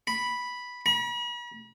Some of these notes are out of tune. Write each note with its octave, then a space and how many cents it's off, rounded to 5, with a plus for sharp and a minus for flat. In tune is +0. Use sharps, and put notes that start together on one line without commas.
B5 -5
B5 -45